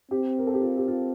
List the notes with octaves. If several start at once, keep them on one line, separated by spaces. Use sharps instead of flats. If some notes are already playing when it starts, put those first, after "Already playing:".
C4 G4
A#4
A4
G4
F4
G4
F4